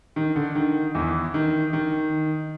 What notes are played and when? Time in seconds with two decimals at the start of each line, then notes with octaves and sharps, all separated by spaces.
0.16 D#3
0.36 D3
0.55 D#3
0.95 E2 E3
1.34 D#3
1.73 D#3